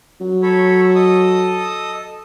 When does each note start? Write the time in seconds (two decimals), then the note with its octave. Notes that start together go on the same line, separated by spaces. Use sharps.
0.21 F#3
0.43 A4 C#5 B5
0.96 A4 D#5 D#6